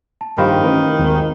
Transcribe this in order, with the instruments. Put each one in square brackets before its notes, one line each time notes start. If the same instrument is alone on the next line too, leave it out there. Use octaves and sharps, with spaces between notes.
[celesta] A5
[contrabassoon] A#1 [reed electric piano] G2 G4 C5 [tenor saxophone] D#3 [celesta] F5 B5
[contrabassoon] A1 [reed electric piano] A#4 B4 D#5
[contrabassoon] G#1 [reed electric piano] D#2 G#3